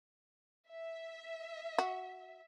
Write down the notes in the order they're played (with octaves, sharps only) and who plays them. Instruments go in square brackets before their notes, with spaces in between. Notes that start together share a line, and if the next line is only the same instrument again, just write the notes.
[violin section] E5
[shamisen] F#4